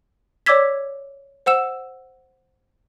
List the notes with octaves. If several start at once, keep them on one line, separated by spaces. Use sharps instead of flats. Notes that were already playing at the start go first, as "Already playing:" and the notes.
C#5 D5 D6 E6 G#6 B6
C5 F#5 E6 E7